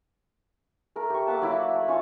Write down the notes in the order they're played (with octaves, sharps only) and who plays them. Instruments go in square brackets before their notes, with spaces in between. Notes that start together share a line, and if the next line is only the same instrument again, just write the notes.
[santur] A3 A4 A#4
G4 C#6
A#3 E5 F#5 A5
F#3 E4 D6
A3
C#4 F4 C#6